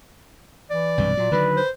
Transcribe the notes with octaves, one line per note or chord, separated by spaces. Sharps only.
E3 D5
B1 G2 C3
A#2 F#3
D3 D#3 F#3 B4
C5